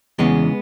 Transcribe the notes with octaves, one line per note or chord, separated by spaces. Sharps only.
E2 C#3 E3 G#3 B3